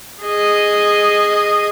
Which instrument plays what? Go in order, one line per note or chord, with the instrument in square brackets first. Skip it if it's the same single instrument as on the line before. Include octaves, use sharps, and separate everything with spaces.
[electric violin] G#4 D#5